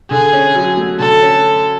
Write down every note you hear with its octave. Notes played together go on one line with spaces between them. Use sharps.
D3 G#4
C#4
F#3
A3
D3 A4
C#4